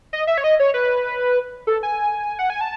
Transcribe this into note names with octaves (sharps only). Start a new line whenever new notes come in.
D#5
E5
C#5
D#5
C#5
B4
A4
G#5
F#5
G#5
A5